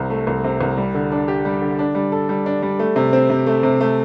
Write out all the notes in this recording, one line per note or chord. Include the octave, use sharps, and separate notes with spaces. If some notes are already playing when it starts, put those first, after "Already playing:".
Already playing: C2 C3
A3
C2
C3
C2
G3
D3
D4
G4
G3
D3
D4
G3
A4
G3
D4
G3
A3
C3
C4
C3
A3
C3
A3